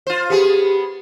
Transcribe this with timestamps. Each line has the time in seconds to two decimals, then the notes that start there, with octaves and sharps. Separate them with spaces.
0.07 F4 C5
0.30 B3 G4 G#4